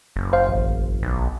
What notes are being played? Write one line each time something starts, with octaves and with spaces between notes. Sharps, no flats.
F#1
C5 F5
A1
B1